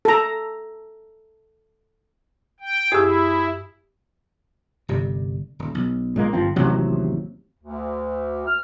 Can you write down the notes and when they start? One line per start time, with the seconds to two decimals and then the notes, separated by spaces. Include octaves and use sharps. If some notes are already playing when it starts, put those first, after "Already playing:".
0.05 A4 A#5
2.60 G5
2.92 F#2 E4 G4 G#4 E6 G#6
4.88 G1 C3 G3
5.59 D#1
5.75 B1
6.16 A#2 G#3 A#3
6.33 G1 F3 C4
6.56 A1 D#2 C3 F#3
7.60 D2
8.46 F6